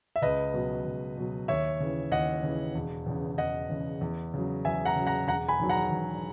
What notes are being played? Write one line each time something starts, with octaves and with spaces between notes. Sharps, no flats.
E5
C#2 B4 D#5
B2 F#3
C#2
B2 F#3
D#2 C#5 E5
C#3 E3
D#2 D#5 F#5
C#3 E3
E1
E2 C#3
E1 D#5 F#5
E2 C#3
E2
C#3 F#3
E2 E5 G#5
F#5 A#5
C#3 F#3
F#5 A#5
E1 F#5 A#5
G#5 B5
E2 D#3 F#3
F#5 A#5
E1